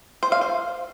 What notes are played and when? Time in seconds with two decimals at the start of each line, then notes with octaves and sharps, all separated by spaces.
0.23 C5
0.32 F5
0.41 C5